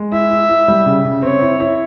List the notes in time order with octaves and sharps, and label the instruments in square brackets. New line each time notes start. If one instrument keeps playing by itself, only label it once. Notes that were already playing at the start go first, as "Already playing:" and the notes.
Already playing: [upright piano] G#3
[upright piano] E4 [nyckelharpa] E5
[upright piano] E4
E4
G3
C#3
C#3
[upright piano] C4 [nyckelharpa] C#5
[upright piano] E4
E4